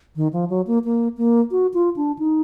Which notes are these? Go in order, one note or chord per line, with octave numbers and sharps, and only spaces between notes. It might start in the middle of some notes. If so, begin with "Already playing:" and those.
D#3
F3
F#3
A#3
A#3
A#3
F#4
F4
D4
D#4